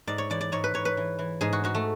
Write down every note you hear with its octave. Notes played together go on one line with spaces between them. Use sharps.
G#2 D5
C#5
E3 D5
D5
G#2 C#5
B4
G#2 C#5
B4
E3
E3
G#2 G#4
F#4
G#2 F#4
A3